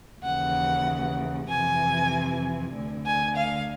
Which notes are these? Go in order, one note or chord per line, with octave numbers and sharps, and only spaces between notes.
D#2 C#3 E3 F#5
F2 C3 E3 G#5
D2 D3
G#5
F5